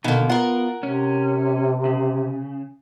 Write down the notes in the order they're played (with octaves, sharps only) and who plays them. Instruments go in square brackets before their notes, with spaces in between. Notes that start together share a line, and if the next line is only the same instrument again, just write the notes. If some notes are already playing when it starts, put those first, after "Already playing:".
[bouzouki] B2 A#3 [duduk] D3 [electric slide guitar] D#3
[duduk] B3 [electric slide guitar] F4 [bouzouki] A#4 F#5
[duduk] C3 [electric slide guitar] C#4
[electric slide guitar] C#3